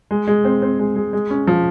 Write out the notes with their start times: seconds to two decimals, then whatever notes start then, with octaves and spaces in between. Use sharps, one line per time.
0.11 G#3
0.28 G#3
0.45 C4
0.62 C4
0.79 G#3
0.96 G#3
1.13 G#3
1.30 C#4
1.47 F3